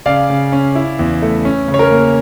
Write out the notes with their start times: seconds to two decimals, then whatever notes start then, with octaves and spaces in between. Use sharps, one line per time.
0.06 C#3 D5 F5
0.30 C#3
0.52 C#4
0.75 E4
0.99 E2
1.22 A3
1.45 C#4
1.68 C#3
1.74 C#5
1.79 A#4
1.91 A#3